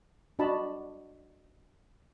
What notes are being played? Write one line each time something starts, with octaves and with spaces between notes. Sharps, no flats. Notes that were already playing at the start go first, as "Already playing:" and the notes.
D4 F#4 D#5 A5 B5